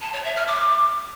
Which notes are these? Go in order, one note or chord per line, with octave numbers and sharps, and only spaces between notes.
A5
C#5
E5
F6
D6